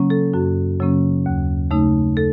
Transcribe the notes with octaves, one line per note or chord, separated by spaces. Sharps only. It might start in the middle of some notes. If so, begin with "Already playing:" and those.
Already playing: C#3 F#3 A#3 C#4
A4
F#2 F#4
C#3 F#3 A#3 C#4
D#2
C#3 A3 D#4
A4